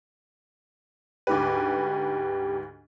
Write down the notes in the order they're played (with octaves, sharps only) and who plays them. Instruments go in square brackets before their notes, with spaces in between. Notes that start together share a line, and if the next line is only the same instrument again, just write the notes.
[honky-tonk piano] D2 G#2 B4 [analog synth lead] G4